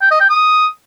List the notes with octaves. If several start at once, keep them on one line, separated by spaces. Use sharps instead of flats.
G5
D#5
G5
D#6